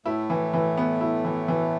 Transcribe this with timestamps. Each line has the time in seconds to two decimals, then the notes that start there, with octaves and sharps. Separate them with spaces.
0.06 A2 A3 E4
0.30 E3
0.53 E3
0.77 B3
1.01 E4
1.25 E3
1.48 E3